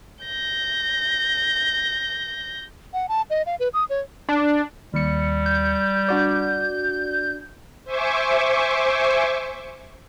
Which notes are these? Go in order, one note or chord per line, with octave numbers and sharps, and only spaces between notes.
G6 A#6
F#5
A5
D#5
F5
B4
D#6
C#5
D4
D#2 G3 C#7
G6
D4 F#4 D5
C5 E5 G#5 C#6 D6